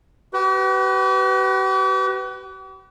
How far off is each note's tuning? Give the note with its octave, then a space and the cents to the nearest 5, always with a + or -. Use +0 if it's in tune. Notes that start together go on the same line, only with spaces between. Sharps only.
G4 -45 B4 +15